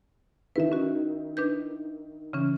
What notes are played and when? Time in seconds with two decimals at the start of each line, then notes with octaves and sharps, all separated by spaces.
0.56 D#3 E4 B4 E5
0.72 C#4 F#4
1.37 D4 B4 G6
2.33 C#3 E3 C#4